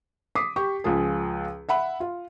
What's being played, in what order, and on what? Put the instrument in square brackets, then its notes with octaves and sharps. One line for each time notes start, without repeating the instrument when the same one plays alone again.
[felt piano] D6 D#6 B6 C7
G4 C#6
C#2 F3 G#4
E5 F#5 B5
F4